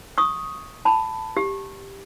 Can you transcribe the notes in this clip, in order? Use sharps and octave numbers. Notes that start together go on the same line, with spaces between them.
C#6 D#6
A5 B5
G4